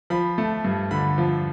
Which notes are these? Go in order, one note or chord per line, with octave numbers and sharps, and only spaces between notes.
F3 B5
A3
G2
D3 B5
F3